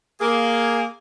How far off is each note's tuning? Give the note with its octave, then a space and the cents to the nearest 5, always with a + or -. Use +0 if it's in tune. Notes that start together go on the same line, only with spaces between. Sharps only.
A#3 +0 G#4 +0